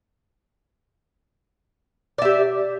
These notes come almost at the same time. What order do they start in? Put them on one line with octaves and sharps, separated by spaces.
D5 E5 G4